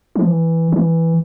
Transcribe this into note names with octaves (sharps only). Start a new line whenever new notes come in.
F3
E3
E3